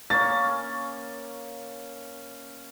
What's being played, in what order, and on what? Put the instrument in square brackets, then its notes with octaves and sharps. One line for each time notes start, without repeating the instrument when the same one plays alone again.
[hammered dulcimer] A#3 C#4 [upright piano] A6